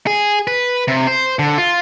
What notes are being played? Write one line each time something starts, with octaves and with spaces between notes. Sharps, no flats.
G#4
B4
C3
C5
D3
F4